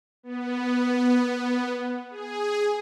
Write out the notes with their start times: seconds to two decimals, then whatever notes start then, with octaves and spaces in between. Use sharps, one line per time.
0.23 B3
2.10 G#4